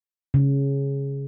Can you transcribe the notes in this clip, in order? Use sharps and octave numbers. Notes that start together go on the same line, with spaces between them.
C#3